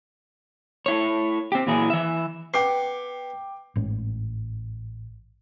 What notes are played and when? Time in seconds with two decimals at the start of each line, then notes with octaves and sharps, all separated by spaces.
0.86 A3 E4 C#5
1.52 C4 G4
1.67 A#2 E3 F#3 E4 G#4
1.90 E3 E5
2.54 B3 G5 D6 C7
3.76 A1 G#2 C#4